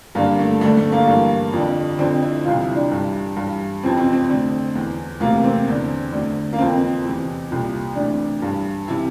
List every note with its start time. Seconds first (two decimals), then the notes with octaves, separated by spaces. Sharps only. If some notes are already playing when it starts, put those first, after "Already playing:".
0.15 G2 A#3
0.19 D3
0.39 A3
0.61 D2 D3 A3
0.77 A3
0.92 A#3
1.07 G2 E3
1.53 F2 D3
1.99 F2 D3 C4
2.22 E4
2.45 C2 C3 E3 F4
2.61 E4
2.75 D4
2.92 G2 E3
3.36 G2 E3
3.83 F2 C3 E3 C4
3.98 C4
4.13 C4
4.29 D2 D3
4.75 E2 E3
5.20 D2 C3 E3 A#3
5.44 C4
5.67 E2 D3
6.12 D2 D3
6.53 A#3
6.59 F2 E3 C4
7.04 E2 C3 E3
7.50 C2 A#2
7.95 D2 C3 E3 D4
8.42 G2 E3
8.88 C3 E3 E4